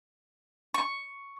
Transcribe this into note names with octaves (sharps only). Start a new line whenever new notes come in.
C#6